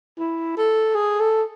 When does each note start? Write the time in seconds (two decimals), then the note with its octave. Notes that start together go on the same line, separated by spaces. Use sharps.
0.19 E4
0.57 A4
0.95 G#4
1.20 A4